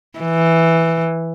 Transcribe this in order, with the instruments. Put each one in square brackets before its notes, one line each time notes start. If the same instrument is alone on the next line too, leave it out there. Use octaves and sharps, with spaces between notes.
[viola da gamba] E3